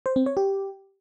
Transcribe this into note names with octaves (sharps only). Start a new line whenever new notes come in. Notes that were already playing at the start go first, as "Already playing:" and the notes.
C5
C4
C#5
G4